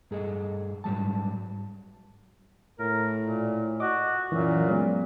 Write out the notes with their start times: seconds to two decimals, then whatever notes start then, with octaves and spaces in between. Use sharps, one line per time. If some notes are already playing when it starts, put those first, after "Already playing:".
0.11 G2 G#4 A4 D#5
0.84 G#2 F#3 G3 A5
2.79 A2 A#4
3.21 A#2
3.80 F#4 D#5 D6
4.32 F#2 A#2 E3
4.69 F#3 G#3 B3